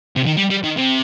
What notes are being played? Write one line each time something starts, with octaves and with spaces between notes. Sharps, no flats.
C3
D#3
G3
G3
D#3
C3